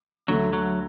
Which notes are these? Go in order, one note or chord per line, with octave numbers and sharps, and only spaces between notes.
D2 D3 F#3 A3
F#3